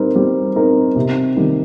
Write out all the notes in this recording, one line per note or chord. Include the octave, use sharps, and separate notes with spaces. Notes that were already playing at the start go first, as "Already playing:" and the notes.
Already playing: G3 C4 D#4 A#4
G3
C4 D#4 A#4
C3
D#3 G3